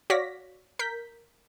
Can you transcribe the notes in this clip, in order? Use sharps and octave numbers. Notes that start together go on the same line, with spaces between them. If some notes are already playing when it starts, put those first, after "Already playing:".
F#4 C#5 D5 F5 A#6 B6
A#4 G6 B6